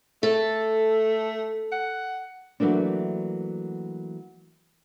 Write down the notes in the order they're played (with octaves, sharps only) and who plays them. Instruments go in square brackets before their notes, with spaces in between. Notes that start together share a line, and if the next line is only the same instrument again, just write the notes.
[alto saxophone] A3 [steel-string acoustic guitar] A4
[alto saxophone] F#5
[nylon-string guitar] E3 F#3 A3 A#3 D4